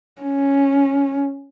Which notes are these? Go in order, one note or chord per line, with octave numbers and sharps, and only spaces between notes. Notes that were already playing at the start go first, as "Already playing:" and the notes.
C#4